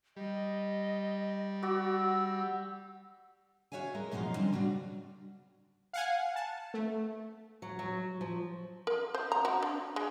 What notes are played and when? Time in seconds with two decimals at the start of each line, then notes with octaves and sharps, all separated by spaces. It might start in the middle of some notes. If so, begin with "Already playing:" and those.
0.16 G3 D#5
1.62 F#4 D5 E6
3.72 F#4 C#5 E5 F5 G#5
3.94 G#3 A#4
4.11 F#2 B2 F3 D#4 F5
4.34 D3 G3 C4 C#4
4.53 C#3 G3 D4 F#4
5.93 F5 F#5 G#5
6.36 A5
6.74 A3
7.62 F#3
7.79 F#3
8.21 F3
8.87 A#4
9.14 C5
9.32 A#5
9.45 F#4
9.63 D4
9.96 G#3